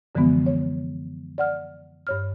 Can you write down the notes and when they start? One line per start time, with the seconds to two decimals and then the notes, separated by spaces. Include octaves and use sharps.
0.15 F#2 D3 E3 F3 G#3 B3
0.46 C#5
1.38 D5 F#5 F6
2.07 G2 C#5 F6